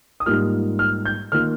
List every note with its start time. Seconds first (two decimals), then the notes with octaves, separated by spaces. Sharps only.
0.20 D#6
0.26 G#2 G3 A#3 F4 F6
0.79 F6
1.05 G6
1.32 D#3 A#3 F4 F6